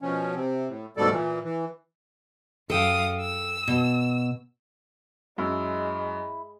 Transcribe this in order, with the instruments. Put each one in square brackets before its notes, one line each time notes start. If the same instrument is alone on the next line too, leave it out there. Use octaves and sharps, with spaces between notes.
[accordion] B2 F3 C#4
C3 C4
A2
D2 G#2 B2 G3 A4 D5
A#2 E3
E3
[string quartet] F#2 F5 D#6 [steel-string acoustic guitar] A4 G5
[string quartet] E6
[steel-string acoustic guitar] B2
[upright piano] F#2 [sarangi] G#3 [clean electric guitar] E4